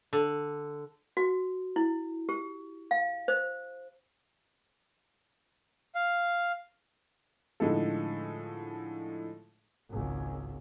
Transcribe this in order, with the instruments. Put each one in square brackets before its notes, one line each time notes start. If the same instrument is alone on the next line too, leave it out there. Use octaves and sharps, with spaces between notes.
[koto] D3
[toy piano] F#4
E4
G4
F5
C5
[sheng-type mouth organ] F5
[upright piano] A2 D3 F3 G#3 D#4 A4
[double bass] G#1 C#2